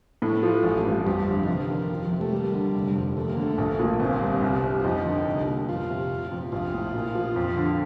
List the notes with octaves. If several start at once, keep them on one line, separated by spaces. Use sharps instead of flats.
A2 A3
F3
A1
G2
F2 G3
D3
D#3
C3 F3
D#3
F2
C3
A3
D#2 G3
D3
F1
F2
D#2 A3
A#3
D3
A3
A#1
A#2
G1 C4
G2
C2
C3
F4
F2 D#4
D3
C2
A#2
F2 F4
C3
F1
F2
A#1 F4
A2
A#2
F3
F2
D3